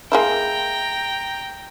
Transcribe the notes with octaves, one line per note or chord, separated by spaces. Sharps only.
G#3 A#3 E4 G5 A#5